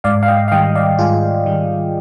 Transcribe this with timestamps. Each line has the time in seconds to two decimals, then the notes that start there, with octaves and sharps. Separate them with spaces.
0.04 G#2 D5 F5
0.23 F5
0.28 D#5 G5
0.48 F5
0.52 D#3 G3 D#5 G5
0.75 D5 F5
0.99 G#2 F4 G#4
1.46 D#3 G3